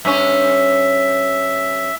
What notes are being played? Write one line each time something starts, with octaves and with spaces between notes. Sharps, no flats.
G2 C#4 E5